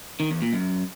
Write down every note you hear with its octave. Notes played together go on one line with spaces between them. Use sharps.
D#3
E2
A#2
F#2